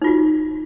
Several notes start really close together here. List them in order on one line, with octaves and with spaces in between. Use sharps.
D#4 F4 F#4